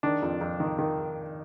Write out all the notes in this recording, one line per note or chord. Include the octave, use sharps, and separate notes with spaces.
D#3 D4
F2
F2
D#3
D#3